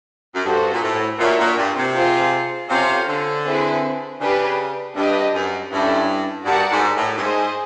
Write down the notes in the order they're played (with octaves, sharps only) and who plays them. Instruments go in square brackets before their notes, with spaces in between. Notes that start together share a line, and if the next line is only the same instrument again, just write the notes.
[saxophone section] F#2
[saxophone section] G2 [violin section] F#4 A4 C5
[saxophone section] A#2
A2
[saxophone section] A#2 [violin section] D4 F#4 A#4 C#5 E5
[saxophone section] A#2
G2
C3
[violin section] F4 G#4 C5 F5
[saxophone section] C3 [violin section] C#4 F4 A4 C5 F5
[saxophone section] D3
[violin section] C4 E4 G#4 B4
[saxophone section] C#3 [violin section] D4 G4 B4
[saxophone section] G2 [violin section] D4 G4 B4 D#5
[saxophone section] F#2
[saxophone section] G2 [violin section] C#4 E4 A4
[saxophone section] G2 [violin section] F#4 A#4 D5 F#5 A5
[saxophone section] G#2
A2
G2
[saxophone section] G#2 [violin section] G#4 C5 D#5